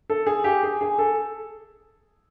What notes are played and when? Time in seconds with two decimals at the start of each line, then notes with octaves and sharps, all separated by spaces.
0.10 A4
0.27 G#4
0.44 G4
0.63 G#4
0.81 G#4
0.99 A4